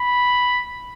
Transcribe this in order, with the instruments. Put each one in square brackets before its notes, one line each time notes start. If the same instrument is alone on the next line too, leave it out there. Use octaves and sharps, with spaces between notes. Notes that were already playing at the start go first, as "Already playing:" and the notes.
Already playing: [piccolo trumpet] B5